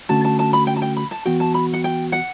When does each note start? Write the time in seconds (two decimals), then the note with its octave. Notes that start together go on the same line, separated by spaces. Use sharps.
0.09 D3 A3 C#4 F#4 A5
0.25 A5
0.39 A5
0.53 B5
0.67 G5
0.76 A5
0.82 G5
0.97 B5
1.11 A5
1.26 E3 B3 F#4 G5
1.40 A5
1.54 B5
1.73 F#5
1.84 G5
2.12 F#5